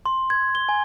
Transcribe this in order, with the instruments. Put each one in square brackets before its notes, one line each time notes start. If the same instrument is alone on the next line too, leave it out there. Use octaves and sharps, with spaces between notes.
[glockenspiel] C6
G#6
G7
G#5